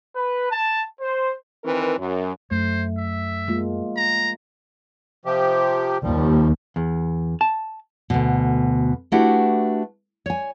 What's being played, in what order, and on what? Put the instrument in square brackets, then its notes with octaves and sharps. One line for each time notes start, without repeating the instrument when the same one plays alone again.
[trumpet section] B4
A5
C5
[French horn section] D#3 E3 C4 A#4 B4
F#2
[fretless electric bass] F#2 [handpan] A3 [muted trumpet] C5
[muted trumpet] E5
[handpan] G#3 A#3 F4
[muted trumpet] A#5
[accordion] C3 F3 G4
[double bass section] D#2 [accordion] F3 G3
[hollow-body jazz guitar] E2
A5
[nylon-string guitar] D2 B2
A3 D4 E4 F#4 G4 B4
C#5 G#5